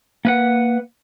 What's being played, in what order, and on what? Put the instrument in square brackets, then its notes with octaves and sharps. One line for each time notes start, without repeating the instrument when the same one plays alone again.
[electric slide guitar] A#3 B4 F#5